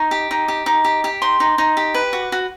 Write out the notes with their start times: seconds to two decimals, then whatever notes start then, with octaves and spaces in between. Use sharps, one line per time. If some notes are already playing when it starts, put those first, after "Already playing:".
Already playing: D#4 C#6
0.11 G4
0.31 D#4
0.48 G4
0.66 D#4
0.84 G4
1.04 G4
1.22 D#4 C6
1.40 D#4
1.58 D#4
1.77 G4
1.94 B4
2.13 F#4
2.32 F#4